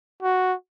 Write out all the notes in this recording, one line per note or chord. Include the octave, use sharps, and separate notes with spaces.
F#4